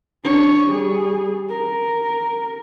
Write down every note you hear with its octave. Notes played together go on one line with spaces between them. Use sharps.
D4 C#5
G3 G#4
A#4